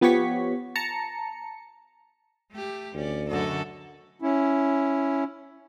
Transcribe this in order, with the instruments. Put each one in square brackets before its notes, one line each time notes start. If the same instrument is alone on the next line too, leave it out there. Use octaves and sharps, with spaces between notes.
[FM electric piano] F3 B3 G4 C#5 C#6 B6
A5 A#5 C#7
[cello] A3 G4
[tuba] D2 [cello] C#4 D5
[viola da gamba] F#2 D3 F#4 [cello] A4 D#5
[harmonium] C#4 E4